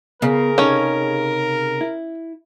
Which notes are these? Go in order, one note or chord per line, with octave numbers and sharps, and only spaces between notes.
C#3 B3 A#4
C3 C#4 D#4 A4 C#5
E4